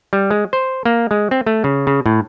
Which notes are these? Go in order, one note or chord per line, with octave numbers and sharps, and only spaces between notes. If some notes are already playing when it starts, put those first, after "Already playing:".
G3
G#3
C5
A#3
G#3
C4
A3
C#3
C#3
A2